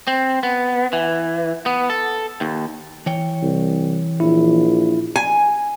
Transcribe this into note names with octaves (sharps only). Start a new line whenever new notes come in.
C4
B3
E3
B3
A4
D#2
E3 C#5 G5
C2
A#1 E4
G#5